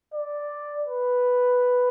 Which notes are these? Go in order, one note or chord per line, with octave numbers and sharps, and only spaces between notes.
D5
B4